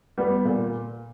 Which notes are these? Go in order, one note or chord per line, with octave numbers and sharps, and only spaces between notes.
G3 B3
A#2